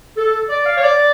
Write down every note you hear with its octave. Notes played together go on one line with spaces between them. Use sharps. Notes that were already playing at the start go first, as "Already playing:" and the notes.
A4
D5
F5
C#5
D5